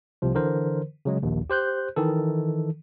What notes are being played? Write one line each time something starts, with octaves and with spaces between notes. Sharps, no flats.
C2 C3 F3
D3 E3 A#4 C5
C#3 F#3 G#3
A#1 D#2
G4 C5 F#6 G6
D#3 E3 A4